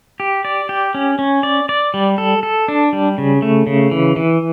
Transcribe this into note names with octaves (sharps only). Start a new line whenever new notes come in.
G4
D5
G4
C#4
C#4
D5
D5
G3
A4
A4
D4
G3
C#3
A3
C#3
E3
E3